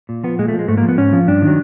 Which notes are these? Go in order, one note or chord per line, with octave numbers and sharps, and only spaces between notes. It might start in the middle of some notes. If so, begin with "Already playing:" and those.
A#2
F3 B3
A#2 G#3
A3
F3
G#3
G#2 A3
A#3
F3
B3
G#2 C#4
F3
G2 D4
D#3 F#3